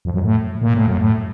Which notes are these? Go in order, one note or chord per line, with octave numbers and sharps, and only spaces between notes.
F2
F#2
A2
A#2
A2
F#2
A2